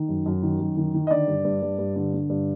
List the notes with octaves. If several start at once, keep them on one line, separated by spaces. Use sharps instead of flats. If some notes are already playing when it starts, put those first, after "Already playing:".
Already playing: D#3
F#2
F#2
D#3
F#2
D#3
D#3
D#5
D3 D5
G2
G2
G2
G2
D3
D3
G2